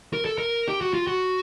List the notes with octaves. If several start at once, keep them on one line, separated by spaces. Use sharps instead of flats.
A#4
A4
A#4
G4
F#4
F4
F#4